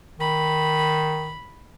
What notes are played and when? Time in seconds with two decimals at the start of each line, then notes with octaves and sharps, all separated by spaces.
0.20 D#3 B5